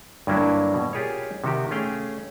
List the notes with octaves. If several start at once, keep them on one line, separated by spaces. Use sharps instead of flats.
G2 D3 F#3 A#3 D4 E4
B2
F4 G4 G#4 A#4 C#5
C3 D#3 F#4 G4
A3 C#4 G#4 F5 G5